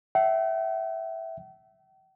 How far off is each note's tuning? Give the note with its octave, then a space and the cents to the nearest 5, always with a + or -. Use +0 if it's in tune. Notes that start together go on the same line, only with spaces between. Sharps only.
E5 +0 G5 -45